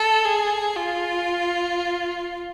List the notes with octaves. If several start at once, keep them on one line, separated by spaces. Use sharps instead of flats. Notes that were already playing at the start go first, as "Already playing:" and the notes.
Already playing: A4
G#4
F4